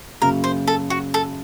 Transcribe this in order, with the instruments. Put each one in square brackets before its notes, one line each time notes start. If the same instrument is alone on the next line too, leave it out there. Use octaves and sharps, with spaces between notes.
[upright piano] F#2 C#3 F#3 A#3 [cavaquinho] A#4
[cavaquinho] C5
A4
F#4
A4